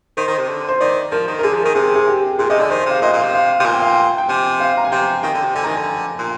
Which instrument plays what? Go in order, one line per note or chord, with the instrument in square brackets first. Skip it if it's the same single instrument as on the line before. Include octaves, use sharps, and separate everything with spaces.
[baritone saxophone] D#3 [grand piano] C5
[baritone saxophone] D#3
C3
D3
[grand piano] C5
[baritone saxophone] D#3 [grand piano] D5
[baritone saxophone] F3 [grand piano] A#4
[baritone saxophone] D#3
[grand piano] A#4
[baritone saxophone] D3 [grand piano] G#4
[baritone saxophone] F3
[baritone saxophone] D#3 [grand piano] A#4
[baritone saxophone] C3 [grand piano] G#4
[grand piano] G#4
G4
[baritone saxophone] A#2 [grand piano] G#4
[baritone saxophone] C3 [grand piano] D#5
[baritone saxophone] D3 [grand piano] D5
[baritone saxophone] D#3 [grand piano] C5
[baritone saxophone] C3 [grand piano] F5
[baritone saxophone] A#2 [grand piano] D#5
[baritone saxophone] A#2
[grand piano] F5
[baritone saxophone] C3
[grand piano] F5
[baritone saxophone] C3
[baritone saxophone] A#2 [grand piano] G#5
[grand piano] G5
F5
G5
G5
[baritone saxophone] C3 [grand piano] G#5
[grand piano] F5
A#5
G#5
[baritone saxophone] C3 [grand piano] G5
[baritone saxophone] D#3 [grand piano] G5
[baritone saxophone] D3
C3
[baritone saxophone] D3 [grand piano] G#5
[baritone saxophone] D#3 [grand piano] A#5
[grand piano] G#5
[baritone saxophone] D3
A#2